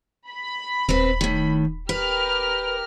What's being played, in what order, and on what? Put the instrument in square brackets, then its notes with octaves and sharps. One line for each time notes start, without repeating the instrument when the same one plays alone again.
[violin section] B5
[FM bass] D#1 [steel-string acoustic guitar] C4 B4
[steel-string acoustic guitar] A2 D#3
[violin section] G4 A#4 F6 [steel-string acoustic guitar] B4